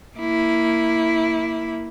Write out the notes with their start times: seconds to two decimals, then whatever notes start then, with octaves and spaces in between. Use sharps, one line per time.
0.17 A#3 E4